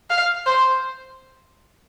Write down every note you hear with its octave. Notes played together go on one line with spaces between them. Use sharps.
F5
C5